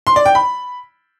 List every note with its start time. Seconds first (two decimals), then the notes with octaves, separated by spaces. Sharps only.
0.07 C6
0.16 D5
0.26 G5
0.35 B5